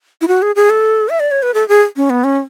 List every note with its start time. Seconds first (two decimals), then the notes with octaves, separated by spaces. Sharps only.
0.21 E4
0.28 F#4
0.42 G#4
0.56 G#4
0.70 A4
1.09 E5
1.20 D5
1.31 C#5
1.43 B4
1.54 A4
1.69 G#4
1.96 C#4
2.10 B3
2.24 C#4